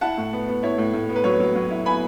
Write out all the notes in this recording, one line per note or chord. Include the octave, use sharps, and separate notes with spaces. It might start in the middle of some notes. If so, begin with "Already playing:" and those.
E4 F#5 A5
A2
B3
B3
E4 C#5
A2
A2
B3
B4
F#3 C#5
F#3
F#3
E4
B3 G#5 B5